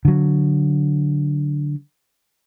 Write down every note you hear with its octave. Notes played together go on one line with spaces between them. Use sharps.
D3 F#3